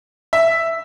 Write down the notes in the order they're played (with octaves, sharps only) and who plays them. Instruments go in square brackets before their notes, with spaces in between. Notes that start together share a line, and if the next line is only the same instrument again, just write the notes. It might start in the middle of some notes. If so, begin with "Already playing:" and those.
[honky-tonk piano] E5